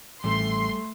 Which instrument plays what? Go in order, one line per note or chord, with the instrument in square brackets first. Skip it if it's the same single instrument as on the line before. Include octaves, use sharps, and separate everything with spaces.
[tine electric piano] A1 [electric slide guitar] G3 A4 [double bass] A3 [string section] C6